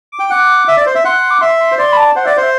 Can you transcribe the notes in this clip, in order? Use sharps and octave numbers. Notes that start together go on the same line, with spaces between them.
D6
G5
F#5 D6
E5
D5
C5
E5
F#5 C6
D6
E5 C6
C6
C5
D5 C6
B5
A5
C5 F#5
D5 E5
F#5
C5
E5